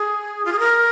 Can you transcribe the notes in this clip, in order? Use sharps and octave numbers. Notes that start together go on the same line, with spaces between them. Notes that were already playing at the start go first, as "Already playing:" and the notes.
Already playing: G#4
F4
G#4
A#4